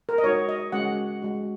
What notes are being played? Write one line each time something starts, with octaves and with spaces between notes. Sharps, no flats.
A#4
D#5
G#3 D#4 F#4 C#5
D#5
G#3 C#4 F#4 F#5
G#3 F#4